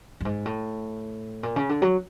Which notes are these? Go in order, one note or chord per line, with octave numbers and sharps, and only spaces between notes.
G2
G#2
A2
A#2
C#3
D3
F#3